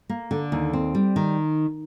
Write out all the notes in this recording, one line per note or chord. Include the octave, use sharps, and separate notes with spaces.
A#3
D3
D#2
C4
G3
D#3